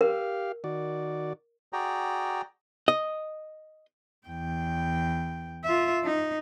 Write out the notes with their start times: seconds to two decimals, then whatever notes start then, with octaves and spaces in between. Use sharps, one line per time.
0.01 G4 A#4 F5
0.64 D#3 F#4 D5
1.73 F#4 G#4 D5 G5 A#5
2.88 D#5
4.27 E2 G5
5.64 F4 E5
6.04 D#4